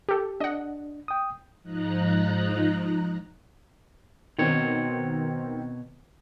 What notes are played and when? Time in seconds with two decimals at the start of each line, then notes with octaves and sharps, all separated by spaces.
0.09 G4 A4
0.40 D4 D#5 F#5
1.08 G5 D#6
1.62 G#2 F3 D#4 A#5 F#6
4.39 B2 D#3 C4 C#5